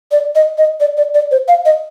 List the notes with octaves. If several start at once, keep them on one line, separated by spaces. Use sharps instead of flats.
D5
D#5
D#5
D5
D5
D5
C5
F5
D#5